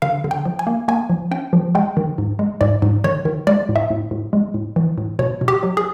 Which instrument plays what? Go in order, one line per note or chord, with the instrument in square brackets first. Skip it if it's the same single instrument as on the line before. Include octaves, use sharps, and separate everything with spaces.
[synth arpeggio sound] D3 F5
D3
G5
F3
G#5
A#3
A#3 G#5
F3
C#4 G5
F3
G#3 G5
D#3
G#2
G#3
G#2 D5
G#2
D#3 C#5
D#3
G#3 D5
A2
E5
A2
A2
G#3
A2
E3
A2
B2 C#5
B2
G4
F#3
G#4